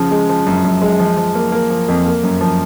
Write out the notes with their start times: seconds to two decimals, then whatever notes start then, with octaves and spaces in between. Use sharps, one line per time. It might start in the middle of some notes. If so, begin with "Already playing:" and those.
Already playing: C#3 F3
0.11 G#3
0.29 F3
0.47 F#2
0.64 F#2
0.82 G#3
0.99 F3
1.17 F3
1.35 A#3
1.52 A#3
1.70 F3
1.88 F2
2.06 A#3
2.23 F#2
2.41 F3